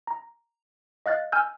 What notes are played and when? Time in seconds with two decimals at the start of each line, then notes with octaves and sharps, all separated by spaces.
0.07 A#5
1.06 D#5 F5 F#6 A6
1.32 G#5 E6 F6 G6